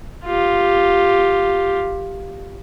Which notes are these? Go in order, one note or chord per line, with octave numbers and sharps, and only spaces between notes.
F4 G4